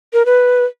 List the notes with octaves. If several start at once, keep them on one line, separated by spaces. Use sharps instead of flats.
A#4
B4